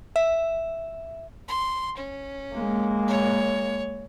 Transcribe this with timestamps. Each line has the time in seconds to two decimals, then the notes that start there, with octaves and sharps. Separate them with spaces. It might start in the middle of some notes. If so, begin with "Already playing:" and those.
0.16 E5
1.48 C6
1.97 C#4
2.54 G#3 A#3
3.08 C#5